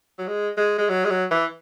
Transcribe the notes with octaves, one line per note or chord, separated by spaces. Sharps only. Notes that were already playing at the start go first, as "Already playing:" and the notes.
F#3
G#3
G#3
G#3
F#3
G#3
F#3
E3